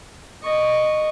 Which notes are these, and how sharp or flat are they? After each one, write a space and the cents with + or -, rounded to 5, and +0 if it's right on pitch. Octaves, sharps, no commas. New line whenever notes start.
D#5 -15 C#6 +0